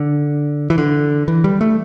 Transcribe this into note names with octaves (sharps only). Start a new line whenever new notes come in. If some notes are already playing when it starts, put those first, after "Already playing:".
Already playing: D3
E3
D3
E3
G3
A3